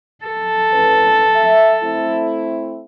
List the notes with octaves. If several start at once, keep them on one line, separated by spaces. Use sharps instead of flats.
A4
A2 C#4 B4
E5
A3 C4 E4